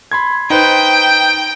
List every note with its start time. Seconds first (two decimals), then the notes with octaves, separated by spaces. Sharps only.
0.12 B5 C6 G#6
0.50 D#4 B4 C5 G5